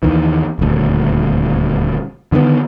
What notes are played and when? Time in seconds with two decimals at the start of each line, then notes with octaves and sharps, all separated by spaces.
0.03 D#2 D#3 E3
0.59 D#1 D2
2.32 D3 D#3 G#3 B3